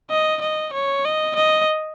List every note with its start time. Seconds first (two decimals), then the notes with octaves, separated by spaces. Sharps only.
0.10 D#5
0.41 D#5
0.73 C#5
1.05 D#5
1.36 D#5